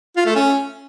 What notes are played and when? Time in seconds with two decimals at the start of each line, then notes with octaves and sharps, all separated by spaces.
0.17 F4
0.26 A3
0.35 C#4